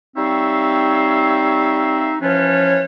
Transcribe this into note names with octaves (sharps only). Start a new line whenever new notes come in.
G3 C4 D#4 C#5 E5 F5
E3 F3 C#4 F4 B4 C#5